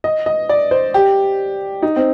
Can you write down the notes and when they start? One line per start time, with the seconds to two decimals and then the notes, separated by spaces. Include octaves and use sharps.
0.04 D#5
0.26 D#5
0.49 D5
0.71 C5
0.94 G4
1.82 D#4
1.96 C4